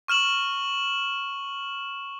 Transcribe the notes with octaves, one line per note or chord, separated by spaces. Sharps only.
C#6 F6 E7 F#7